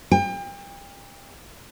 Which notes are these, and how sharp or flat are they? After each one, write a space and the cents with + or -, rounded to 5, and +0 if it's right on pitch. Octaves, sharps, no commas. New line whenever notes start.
G5 +35